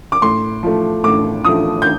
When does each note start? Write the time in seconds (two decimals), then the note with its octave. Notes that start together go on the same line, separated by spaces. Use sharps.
0.12 D6
0.22 A2 C6
0.63 F3 A3
1.04 A2 D6
1.44 F3 A3 D#6
1.82 G6